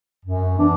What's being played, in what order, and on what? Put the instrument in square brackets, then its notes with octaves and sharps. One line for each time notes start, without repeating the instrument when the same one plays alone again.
[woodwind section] F#2
E3 B3 D4